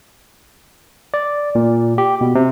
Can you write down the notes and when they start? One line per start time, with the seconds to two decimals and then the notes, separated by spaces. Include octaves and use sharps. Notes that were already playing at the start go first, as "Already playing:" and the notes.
1.14 D5
1.55 A#2
1.98 G4
2.21 B2
2.35 C3